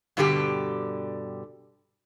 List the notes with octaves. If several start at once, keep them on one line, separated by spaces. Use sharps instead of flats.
G2 B2 D3 G3 G4